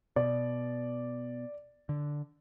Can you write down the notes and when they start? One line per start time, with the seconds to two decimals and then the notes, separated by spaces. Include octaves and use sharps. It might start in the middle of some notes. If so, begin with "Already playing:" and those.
0.16 B2 D5
1.89 D3